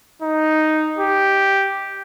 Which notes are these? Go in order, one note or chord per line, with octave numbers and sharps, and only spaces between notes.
D#4
G4